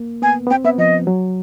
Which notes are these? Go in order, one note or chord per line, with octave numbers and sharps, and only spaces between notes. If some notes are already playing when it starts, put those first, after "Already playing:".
Already playing: A#3
B3 G#5
B3
C4 G5
B3 E5
F3 D#5
F#3